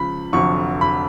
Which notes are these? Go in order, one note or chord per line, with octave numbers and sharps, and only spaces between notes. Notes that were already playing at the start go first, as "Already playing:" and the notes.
Already playing: C#2 C#3 F3 B5
F1 F2 D3 F#3 C#6
B5